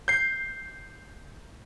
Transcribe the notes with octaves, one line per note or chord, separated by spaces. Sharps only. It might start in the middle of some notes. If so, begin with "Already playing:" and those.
G6 C7